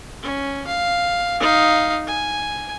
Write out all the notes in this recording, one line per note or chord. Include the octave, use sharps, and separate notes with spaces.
C#4
F5
D#4 F5
G#5